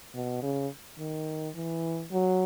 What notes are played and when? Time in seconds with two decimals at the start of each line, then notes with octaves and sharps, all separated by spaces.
0.14 B2
0.43 C#3
0.99 D#3
1.55 E3
2.11 F#3